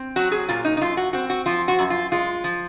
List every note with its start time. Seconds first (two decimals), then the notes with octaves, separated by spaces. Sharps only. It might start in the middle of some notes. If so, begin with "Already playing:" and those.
Already playing: C4
0.16 F#3 F#4
0.32 G#4
0.49 A#2 F4
0.65 D#4
0.77 D#4
0.81 F#2 F4
0.97 F#4
1.13 C4 F#4
1.30 F#4
1.46 F3 F4
1.68 F#4
1.79 F#2
1.90 F4
2.12 G#3 F4
2.44 F3